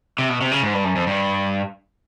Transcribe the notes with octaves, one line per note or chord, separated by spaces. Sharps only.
C3
B2
C3
C#3
G#2
G2
F#2
F2
G2